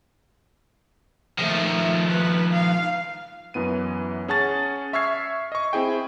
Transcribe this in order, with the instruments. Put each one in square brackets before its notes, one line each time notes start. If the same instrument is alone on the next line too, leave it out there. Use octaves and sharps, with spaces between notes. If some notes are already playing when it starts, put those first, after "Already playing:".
[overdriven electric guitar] D#3 F3 [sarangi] A3
[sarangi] B4
F5
[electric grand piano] F#2 E3 B3 D#7
C#4 G#4 F#5 A5 C#6 A6
E5 C#6 E6 F6 G#6 C7
D#5 C#6
C4 E4 G#4 G5